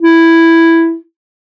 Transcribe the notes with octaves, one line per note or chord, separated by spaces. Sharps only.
E4